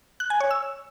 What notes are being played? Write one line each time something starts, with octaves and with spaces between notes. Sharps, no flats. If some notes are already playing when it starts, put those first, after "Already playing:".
F#6
G#5
C#5
E6